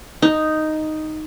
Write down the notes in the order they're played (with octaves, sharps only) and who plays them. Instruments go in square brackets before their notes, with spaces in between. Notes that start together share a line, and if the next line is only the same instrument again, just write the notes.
[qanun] D#4